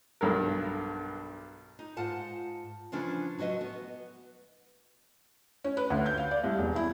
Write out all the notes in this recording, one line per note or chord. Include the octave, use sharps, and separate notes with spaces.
B1 G2 A4 A#4
D#4
G#2 F4 F#5 A5
C#3 E3 F3 C#4 D4 F4
F#3 F#4 B4 D#5 E5
B3
C#4
B4
D2
G6
F5
D5
C2
E1
E4